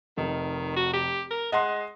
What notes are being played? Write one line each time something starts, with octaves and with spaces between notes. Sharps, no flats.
F1 D#3
F#4
G4
A#4
G#3 D#5 F#5 C6